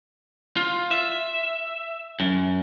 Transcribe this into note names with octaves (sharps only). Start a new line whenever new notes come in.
F4
E5
F#2